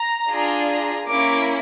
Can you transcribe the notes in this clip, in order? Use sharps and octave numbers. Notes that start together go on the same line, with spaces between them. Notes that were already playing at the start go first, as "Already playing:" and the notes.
Already playing: A#5
D4 F4 G#4
A#5
A#3 C#4 E4 D6